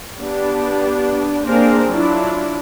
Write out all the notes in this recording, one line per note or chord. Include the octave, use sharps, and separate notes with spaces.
B3 D4 G4
A#3 C4 D4 G#4 A#4 C5
F#3 D4 E4 F4